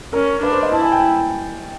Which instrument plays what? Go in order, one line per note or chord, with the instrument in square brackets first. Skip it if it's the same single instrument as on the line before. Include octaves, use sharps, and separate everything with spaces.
[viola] C#4 [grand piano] A#4
[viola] D4 [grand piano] B4
[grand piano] C5
D#5
[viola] E4 [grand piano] A5
[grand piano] G#5
G5